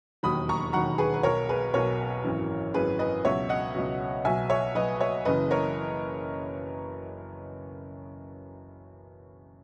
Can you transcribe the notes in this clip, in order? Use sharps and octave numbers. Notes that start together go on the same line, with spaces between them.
E1 D#2 D#3 F#3 B5 D#6
A#5 C#6
E1 D#2 D#3 F#3 F#5 A#5
G#4 B4
B4
B1 B2 F#3 A#4 C#5
G#4 B4
B1 B2 F#3 A#4 C#5
G#1 F#2 E3
G#1 F#2 E3 G#4 B4
B4 D#5
C#2 B2 F#3 C#5 E5
D#5 F#5
C#2 B2 F#3
B1 B2 F#3 E5 G#5
C#5 E5
B1 B2 F#3 B4 D#5
C#5 E5
F#1 F#2 C#3 E3 B4 D#5
A#4 C#5